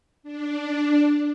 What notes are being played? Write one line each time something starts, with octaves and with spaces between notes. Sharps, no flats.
D4